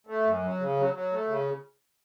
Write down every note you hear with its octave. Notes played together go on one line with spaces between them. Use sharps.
A3
F#2
F#3
C#3
F#3
F#3
A3
C#3